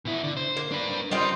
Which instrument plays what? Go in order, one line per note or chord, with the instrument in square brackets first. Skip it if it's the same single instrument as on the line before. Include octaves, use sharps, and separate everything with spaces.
[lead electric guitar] B2 E4
D3
C5
[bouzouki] A#3
[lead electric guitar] D4 B4
[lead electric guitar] G3 [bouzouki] C4 D#4 F4